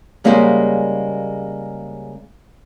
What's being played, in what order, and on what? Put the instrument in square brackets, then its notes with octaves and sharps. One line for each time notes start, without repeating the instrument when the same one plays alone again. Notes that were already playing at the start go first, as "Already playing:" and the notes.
[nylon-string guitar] C#3 G3 G#3 A#3 F#4 C5